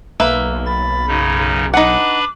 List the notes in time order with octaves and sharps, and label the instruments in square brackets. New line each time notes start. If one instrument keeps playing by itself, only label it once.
[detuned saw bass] B1 [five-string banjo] A#3 B4 E5
[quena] B5 [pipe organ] A6
[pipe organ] F#2 C#3 D#4
[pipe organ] D4 B4 B5 [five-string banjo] D#4 F#5 [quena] D6